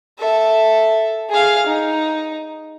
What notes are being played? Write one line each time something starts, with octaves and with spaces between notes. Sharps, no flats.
A4 E5
G#4 F5
D#4